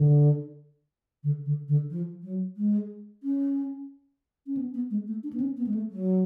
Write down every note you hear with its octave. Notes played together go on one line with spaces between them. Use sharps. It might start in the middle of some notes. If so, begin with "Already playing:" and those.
Already playing: D3
D3
D3
D3
F3
F#3
G#3
C#4
C#4
B3
B3
G#3
A3
D4
B3
C#4
B3
G#3
A3
F#3